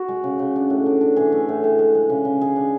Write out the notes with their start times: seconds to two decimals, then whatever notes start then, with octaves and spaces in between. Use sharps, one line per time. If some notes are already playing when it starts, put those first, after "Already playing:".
Already playing: F#4
0.08 G#3
0.24 C#3
0.39 C#3
0.56 D4
0.70 A2
0.86 D4
1.01 D4
1.17 E3 G#4
1.32 A3
1.49 A2
1.64 A2
1.79 G#3
1.95 G#3
2.10 C#3
2.25 C#3
2.41 G#3 G#4
2.56 D4